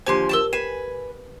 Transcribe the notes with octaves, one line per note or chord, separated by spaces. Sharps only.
D#2 D3 F3 G4 C5 G#5 C6
A#4 A5 C6 E6 E7
B4 G#5 C7 D#7 E7